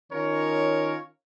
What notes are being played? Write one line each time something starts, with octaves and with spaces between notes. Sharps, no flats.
D#3 C#4 F4 A#4 C#5